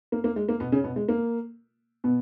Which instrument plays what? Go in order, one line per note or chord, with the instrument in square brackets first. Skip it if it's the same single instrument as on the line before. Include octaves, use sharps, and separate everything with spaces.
[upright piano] A#3
A#3
G#3
A#3
B2 B3
C#3 C#4
B2 B3
G#3
A#3
B2 B3